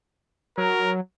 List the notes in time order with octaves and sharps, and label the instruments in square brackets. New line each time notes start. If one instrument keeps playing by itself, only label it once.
[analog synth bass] F#3 [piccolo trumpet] A#4